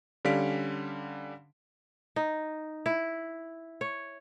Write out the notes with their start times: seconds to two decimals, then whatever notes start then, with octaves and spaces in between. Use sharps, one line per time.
0.25 D3 G3 C#4 F5 B6 D7
2.16 D#4
2.86 E4
3.81 C#5